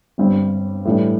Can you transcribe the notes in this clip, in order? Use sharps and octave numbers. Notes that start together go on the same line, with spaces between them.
G1 G2 G3 C4
A2 E3 G3 D4